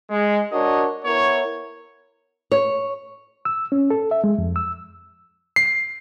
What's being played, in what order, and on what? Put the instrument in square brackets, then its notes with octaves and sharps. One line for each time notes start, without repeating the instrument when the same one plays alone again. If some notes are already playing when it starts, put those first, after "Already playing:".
[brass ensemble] G#3
D4 F#4 A#4 C#5 D#5
B3 E4 A#4 C#5
[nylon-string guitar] C#5
[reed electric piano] E6
C#4
A4
E5
G#3
F2
E6
[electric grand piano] C7